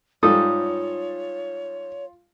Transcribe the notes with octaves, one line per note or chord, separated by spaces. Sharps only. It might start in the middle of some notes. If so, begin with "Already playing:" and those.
G#2 G3 F4 A4 C#5 D#6